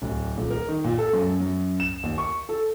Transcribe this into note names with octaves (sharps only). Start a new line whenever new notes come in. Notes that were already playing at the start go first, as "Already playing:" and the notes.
D1
D#1
A#4
D#3
A#2
A4
F#2
F#2
E7
D#2
C#6
A4